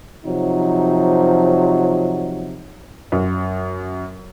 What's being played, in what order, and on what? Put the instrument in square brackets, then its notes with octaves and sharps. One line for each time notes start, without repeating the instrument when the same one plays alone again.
[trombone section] C3 F3 F#3 D#4
[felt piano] F#2